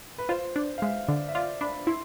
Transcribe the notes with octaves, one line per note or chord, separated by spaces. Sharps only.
B4
F4 C5
D4
F5
G#3 E5
D3 D5
E5
F4 D5
D4 B5
E4 C6